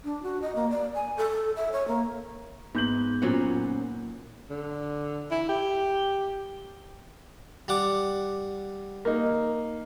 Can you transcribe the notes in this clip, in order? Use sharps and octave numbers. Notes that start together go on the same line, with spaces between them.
D4
F#4
D#5
A#3
D5
G#5
A4
E5
C#5
A#3
G#2 B3 G6 F#7
F#2 A#2 F#3 C4 C#4 F#5
D3
E4
G4
G3 F#5 D6
A#3 D#4